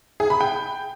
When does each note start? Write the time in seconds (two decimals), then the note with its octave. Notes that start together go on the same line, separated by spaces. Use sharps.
0.20 G#4
0.30 B5
0.41 G5